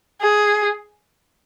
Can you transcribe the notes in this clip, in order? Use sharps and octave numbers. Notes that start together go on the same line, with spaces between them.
G#4